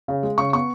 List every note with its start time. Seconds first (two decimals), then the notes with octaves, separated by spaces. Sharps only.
0.08 C#3
0.23 G#3
0.38 C#3 C#6
0.53 B3 C#6